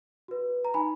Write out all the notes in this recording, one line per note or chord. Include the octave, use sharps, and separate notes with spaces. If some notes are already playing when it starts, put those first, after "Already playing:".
F#4 B4
A#5
D#4 G#5 B5